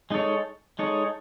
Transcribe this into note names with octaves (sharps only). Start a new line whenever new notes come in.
G#3 D#4 A4 C#5
G#3 D#4 A4 C#5